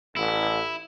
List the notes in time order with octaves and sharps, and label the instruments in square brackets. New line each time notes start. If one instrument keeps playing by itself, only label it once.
[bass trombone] A1 [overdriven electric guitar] E4